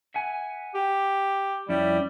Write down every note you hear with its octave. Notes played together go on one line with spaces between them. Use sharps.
E5 F#5 G#5
G4
F2 G3 C#4 E4